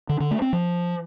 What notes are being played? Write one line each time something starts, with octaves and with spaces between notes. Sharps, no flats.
D3
D3
A3
C4
F3